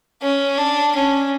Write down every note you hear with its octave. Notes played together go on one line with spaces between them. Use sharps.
C#4
D4
C#4